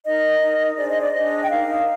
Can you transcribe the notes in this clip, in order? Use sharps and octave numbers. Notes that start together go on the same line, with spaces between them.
D#4 A#4 D#5
D#4 A#4
D4 G#4 C5 D5
D#5
D5
D4 G#4 C5 D#5
G5
D#4 A#4 F5